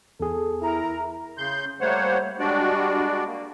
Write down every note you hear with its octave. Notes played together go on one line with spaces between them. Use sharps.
E2 G#4 A4
E4 A#4 A#5
C#3 C6 G6
G3 A3 A#3 C5 C#5 F#5
G3 G#3 D4 F#4 D5
A#3